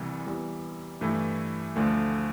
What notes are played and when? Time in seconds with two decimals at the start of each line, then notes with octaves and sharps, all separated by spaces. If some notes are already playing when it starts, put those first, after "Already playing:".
Already playing: C2 C3 E3 G3
0.26 E2 E3 G3
1.01 G2 E3 A3 E4
1.76 D2 D3 F3 A3